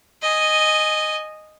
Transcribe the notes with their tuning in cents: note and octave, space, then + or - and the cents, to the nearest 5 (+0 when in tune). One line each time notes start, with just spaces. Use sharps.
D#5 -5 G#5 +0